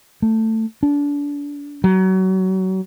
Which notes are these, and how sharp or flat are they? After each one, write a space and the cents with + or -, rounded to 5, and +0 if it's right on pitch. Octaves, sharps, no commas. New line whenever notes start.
A3 +15
D4 -30
F#3 +25